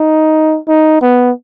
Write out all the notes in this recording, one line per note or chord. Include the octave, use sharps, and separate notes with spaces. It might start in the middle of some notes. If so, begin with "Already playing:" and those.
Already playing: D#4
D#4
B3